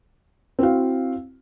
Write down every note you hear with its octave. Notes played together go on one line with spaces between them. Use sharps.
C4 E4 F#4 F5